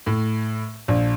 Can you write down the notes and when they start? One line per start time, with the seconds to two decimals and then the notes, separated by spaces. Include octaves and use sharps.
0.07 A2
0.88 A#1